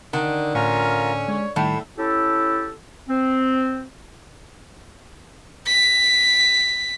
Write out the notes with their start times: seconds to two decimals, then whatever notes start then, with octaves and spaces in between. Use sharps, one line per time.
0.13 D3 D#3
0.55 A2 C#4 F4 A#4 F5
1.28 G#3 C#5
1.56 A2 D#3 G3 A3 E6
1.98 C#4 E4 G4 A4
3.09 C4
5.66 B6